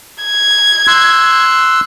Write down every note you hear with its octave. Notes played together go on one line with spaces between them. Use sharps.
G#6
C6 E6 F#6